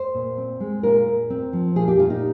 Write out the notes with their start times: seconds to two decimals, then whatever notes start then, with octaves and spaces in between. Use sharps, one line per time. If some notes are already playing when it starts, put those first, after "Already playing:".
Already playing: C5
0.14 A#2
0.38 C4
0.60 G#3
0.83 A#2 A#4
1.07 A#2
1.30 C4
1.53 F3
1.76 A#2 G#4
1.88 G4
1.99 A#2 F4
2.10 D#4